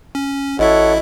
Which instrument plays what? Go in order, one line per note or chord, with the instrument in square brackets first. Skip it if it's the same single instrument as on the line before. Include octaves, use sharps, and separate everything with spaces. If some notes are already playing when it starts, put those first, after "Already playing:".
[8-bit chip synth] C#4
[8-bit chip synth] A1 E4 E5 [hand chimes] F#4 D#5 [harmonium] A4 C#5 F#5